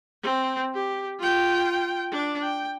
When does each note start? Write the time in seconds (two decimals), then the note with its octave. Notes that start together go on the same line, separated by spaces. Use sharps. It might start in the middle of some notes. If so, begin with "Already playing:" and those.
0.23 C4
0.74 G4
1.19 F4 G5
2.11 D4
2.42 G5